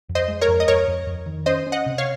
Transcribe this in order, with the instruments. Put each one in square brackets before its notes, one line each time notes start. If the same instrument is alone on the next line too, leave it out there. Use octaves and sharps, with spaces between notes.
[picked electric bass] F2
[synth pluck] C5 D#5
[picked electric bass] G#3
[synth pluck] A#4 C#5
[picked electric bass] F2
[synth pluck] D#5
[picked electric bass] F2 [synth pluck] A#4 C#5
[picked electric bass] F2
F2
D#3
[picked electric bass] C#4 [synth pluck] C5 D#5
[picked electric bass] C#4
[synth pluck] D#5 F#5
[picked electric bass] C3
[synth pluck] C#5 F5